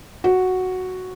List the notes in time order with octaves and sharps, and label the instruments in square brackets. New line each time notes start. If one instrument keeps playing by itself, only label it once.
[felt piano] F#4